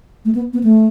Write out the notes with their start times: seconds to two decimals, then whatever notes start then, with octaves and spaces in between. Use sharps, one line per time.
0.25 A3
0.35 B3
0.53 B3
0.64 A3